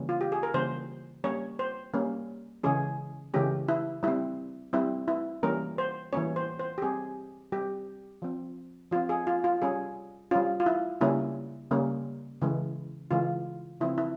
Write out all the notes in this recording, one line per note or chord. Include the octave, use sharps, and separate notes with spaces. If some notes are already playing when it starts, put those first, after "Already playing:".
Already playing: C#3 E3 G3 A#3 C#4
F4
G4
G#4
A#4
C#3 E3 G3 A#3 C#4 C5
G3 A#3 C#4 C#5
C5
G3 A#3 C#4
C#3 E3 G#3 C#4 G#4
C#3 E3 G#3 C#4 G4
E4
G3 C4 E4
G3 C4 E4
E4
E3 G3 A#3 C#4 A#4
C5
E3 G3 A#3 C#4 C#5
C5
C5
G4
G3 C4 G#4
G3 C4 G4
F3 C4
F3 C4 F4
G#4
F4
F4
G3 C#4 G#4
G3 C#4 F4
F4
E4
C#3 G3 A#3 C#4 E4
C#3 G3 A#3 C#4
C#3 E3 G#3
C#3 E3 G#3 F4
C#3 F3 C4 E4
E4